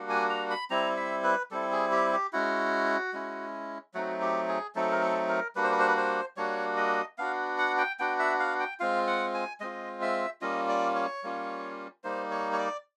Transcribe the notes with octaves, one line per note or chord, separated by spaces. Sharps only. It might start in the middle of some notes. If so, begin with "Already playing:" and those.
Already playing: G3 A#3 D4 F#4
G#5
A#5
B5
G3 C4 E4 A#5
E5
B4
G3 C4 E4 A4
G#4
G4
G4
G#3 C#4 E4 F#4
G#3 C#4 E4
F#3 A3 C4 D#4 F#4
G4
G#4
F#3 A3 C4 D#4 A4
A#4
A4
A#4
G3 A#3 D4 F#4 B4
C5
B4
C5
B4
C5
G3 A#3 D4 F#4 C#5
D#5
B3 D4 F#4 F5
F#5
G5
B3 D4 F#4 G5
E5
F5
G5
G#3 C4 F4 F5
F#5
G#5
G#3 C4 F4 D#5
E5
G3 A#3 C#4 F4 D#5
D5
C#5
G3 A#3 C#4 F4
G3 A#3 D#4 C5
C#5
C#5
D5